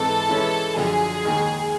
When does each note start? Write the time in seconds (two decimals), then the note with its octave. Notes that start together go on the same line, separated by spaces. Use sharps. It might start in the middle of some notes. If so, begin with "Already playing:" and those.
Already playing: G#2 E3 G#3 C4 E4 A4
0.29 E3 G#3 C#4 E4
0.77 F#2 D3 F3 G#4
1.24 D#2 D#3 G#3